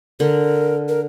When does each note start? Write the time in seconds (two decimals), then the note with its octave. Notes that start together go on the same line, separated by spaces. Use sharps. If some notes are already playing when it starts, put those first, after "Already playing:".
0.20 D3 A#4
0.89 A#4